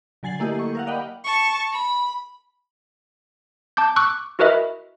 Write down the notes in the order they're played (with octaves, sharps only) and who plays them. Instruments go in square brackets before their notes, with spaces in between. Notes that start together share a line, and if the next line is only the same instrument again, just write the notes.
[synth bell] D3 F#3 G#5 A6 C7 F#7
A3 A#3 E4 G4 A4 D#5
C#6
A#4 F5 F#5
D5 D#5 F#5 G5 B5
[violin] A5 C#6
B5
[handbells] A5 D6 G6
C#6 D6 E6 F#6
E4 F#4 A#4 B4 D#5 E5